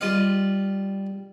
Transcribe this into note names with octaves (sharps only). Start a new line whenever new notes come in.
G3 F4 D#5 F5